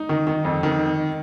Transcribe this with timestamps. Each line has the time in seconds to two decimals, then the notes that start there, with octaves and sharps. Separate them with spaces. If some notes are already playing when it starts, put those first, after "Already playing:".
Already playing: D#4
0.09 D#3
0.27 D#3
0.45 F2
0.63 D#3